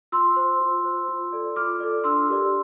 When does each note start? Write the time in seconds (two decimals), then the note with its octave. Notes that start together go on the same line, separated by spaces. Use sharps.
0.12 F4 C6 E6
0.36 C5
0.61 F4
0.85 C5
1.08 F4
1.32 A4 D5
1.56 F4 D6 F6
1.80 A4 D5
2.04 D4 C6 E6
2.28 G4 A#4 D5